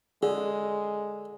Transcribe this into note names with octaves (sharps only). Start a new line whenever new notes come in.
D3 G#3 G#4